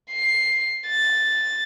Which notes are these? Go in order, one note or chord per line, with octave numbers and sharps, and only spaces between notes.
C7
A6